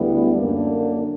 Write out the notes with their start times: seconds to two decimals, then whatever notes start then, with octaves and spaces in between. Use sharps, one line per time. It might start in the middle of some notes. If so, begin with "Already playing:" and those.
Already playing: D2 D3 G3 B3 E4
0.35 F#2 D3 A#3 D4